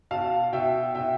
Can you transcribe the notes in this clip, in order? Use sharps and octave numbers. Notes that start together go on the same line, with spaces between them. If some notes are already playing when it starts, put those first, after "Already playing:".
B2 F5 A5
B2 E5 G5
B2 E5 G5